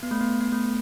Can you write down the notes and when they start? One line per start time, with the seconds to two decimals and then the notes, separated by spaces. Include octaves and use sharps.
0.03 B3
0.11 A3
0.20 B3
0.40 B3
0.52 A3